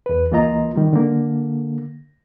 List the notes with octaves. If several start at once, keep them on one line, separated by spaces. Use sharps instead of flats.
E2 B4
C#2 E3 A#3 F4 D#5 A#5
D#3 G3
D3 A#3